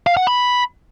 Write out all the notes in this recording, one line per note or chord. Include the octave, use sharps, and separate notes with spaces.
F5
F#5
B5